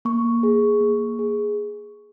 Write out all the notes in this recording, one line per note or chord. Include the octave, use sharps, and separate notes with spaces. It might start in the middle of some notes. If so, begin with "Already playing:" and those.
A#3 C#6
G#4
A#3
G#4